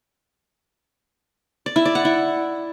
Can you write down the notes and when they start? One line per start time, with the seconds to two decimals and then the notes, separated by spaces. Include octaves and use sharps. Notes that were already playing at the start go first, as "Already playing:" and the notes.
1.66 D5
1.76 E4
1.85 D5
1.95 F#5
2.05 E4